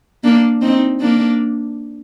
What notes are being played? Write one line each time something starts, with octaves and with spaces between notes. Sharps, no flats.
A#3 D4
C4 D#4
A#3 D4